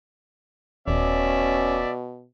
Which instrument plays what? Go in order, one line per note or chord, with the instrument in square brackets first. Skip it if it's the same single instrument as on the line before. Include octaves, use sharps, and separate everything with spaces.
[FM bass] D#1 [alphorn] B2 [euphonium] C#4 [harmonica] D5 E5